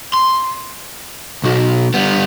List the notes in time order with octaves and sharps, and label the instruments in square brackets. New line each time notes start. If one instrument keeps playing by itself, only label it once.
[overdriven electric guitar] C6
B1 F#4
G3 B3